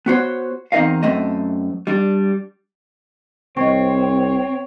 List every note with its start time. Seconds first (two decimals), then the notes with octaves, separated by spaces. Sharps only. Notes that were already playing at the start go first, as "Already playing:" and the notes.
0.06 B3 F#4 C5 C#5
0.72 E2 C4 D#4 A#4 D#5 F5
1.03 F#2 A3 C4 D#5
1.87 G3 D4
3.57 C2 C4 C#5 D#5 G5 C#6